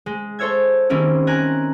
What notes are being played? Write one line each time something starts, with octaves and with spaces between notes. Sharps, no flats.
G#3
A4 C5 C#5 E5 G#6
D#3 G3 A#3 C4 C#4 E4
A#4 G#5 A#5 F#6